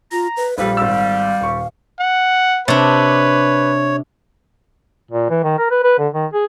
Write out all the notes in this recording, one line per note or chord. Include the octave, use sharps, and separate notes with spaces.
F4 A#5
B4
A#1 G3 A4 B4 F5
G#1 G3 E6
D#1 C#6
F#5
C3 D4 B4 C#5
A#2
E3
D#3
A#4
B4
B4
D3
D#3
G#4